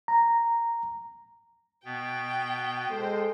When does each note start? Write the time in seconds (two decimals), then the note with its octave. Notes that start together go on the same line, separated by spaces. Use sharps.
0.08 A#5
1.85 B2 B3 G5
2.90 G#3 A4 C5